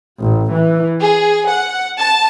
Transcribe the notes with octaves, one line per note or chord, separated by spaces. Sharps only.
A1
E3
G#4
F#5
A5